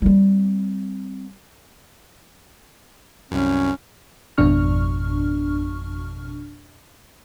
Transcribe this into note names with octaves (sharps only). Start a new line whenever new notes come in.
G3 C4
C2 F#2 C#4
G#1 F2 B2 D4 C#6 F6